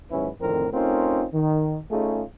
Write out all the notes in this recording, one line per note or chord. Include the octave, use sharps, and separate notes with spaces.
D#2 G#2 F#3 C#4 E4 B4
F2 A2 D3 D#3 C4 A#4
A3 C4 C#4 D#4 F4 A#4
D#3
A3 C#4 D#4 F4 G#4